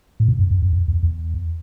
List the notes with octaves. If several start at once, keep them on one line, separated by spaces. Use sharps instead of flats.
A2
A#2
F#2
F2
F2
F2
E2
E2